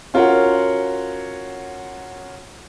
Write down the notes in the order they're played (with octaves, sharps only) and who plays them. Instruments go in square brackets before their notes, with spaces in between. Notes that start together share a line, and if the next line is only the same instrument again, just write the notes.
[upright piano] C#4 F4 F#4 A#4 C#5 F#5